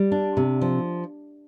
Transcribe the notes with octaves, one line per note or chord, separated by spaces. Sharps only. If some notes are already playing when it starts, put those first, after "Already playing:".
Already playing: G3
D4
C3
F3